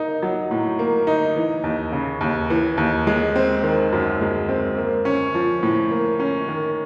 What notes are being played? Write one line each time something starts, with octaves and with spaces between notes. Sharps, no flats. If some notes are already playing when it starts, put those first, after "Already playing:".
Already playing: A#3 D#4
F#3
A2
A#3
D#4
E3
D#2
C#3
D#2
E3
D#2
G#3
C4
D#3
F#2
G#3
C4
A#3
C#4
F3
A2
A#3
C#4
D#3